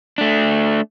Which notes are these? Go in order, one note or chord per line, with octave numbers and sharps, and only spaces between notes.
A3 D4